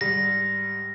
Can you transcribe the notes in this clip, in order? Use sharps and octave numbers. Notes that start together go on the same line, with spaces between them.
G#2 G3 A#6